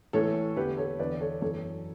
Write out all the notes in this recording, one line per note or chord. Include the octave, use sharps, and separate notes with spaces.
A2 E3 A4 C#5
E2 D3 G4 B4
A4 C#5
E2 D3 B4 D5
A4 C#5
F#2 E3 A4 C#5